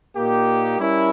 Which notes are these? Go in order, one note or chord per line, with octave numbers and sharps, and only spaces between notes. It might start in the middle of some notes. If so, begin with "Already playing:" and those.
A#2 A#3 D#4 G4
G3 C#4 E4 A#4